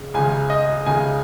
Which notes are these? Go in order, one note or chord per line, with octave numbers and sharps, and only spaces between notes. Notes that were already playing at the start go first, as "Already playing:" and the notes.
Already playing: C#2 C#3
C#2 C#3 G#5
D#5
C#2 C#3 G#5